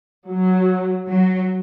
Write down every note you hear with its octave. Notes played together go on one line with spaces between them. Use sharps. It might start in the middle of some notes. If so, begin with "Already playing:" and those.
F#3
F#3